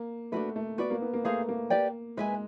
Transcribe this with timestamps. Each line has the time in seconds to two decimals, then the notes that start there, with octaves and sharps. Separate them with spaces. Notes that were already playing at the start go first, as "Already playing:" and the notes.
Already playing: A#3
0.32 A3 D4 F#4 B4
0.56 A3
0.78 B3 F#4 B4 D5
0.90 A#3
1.02 B3
1.13 A#3
1.24 A3 G#4 C5 F5 A#5
1.49 A#3
1.70 G4 B4 D5 G5
2.17 G#3 B4 E5 G#5